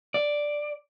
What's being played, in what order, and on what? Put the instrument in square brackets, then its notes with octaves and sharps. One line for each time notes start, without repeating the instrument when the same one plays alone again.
[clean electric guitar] D5